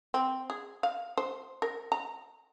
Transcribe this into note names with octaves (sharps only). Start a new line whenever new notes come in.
C4
G#4
F5
C5
A#4
A#5